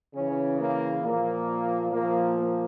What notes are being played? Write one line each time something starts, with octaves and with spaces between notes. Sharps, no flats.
C#3 E3 C#4
A#3
A#2 F3 A#3
A#2 F3 A#3
A#3